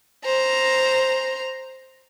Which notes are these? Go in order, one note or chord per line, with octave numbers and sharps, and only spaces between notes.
C5 A#5